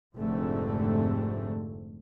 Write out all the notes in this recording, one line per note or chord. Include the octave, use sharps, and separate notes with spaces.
F1 F2 G#2 D3 A3 C4